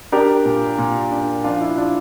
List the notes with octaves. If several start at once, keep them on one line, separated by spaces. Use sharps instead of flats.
D4 G4 A#4
A#2
A#2
D4
F3 D4 F4
E4
D4 F4